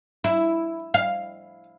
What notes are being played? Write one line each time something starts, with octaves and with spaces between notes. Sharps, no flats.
E4
F5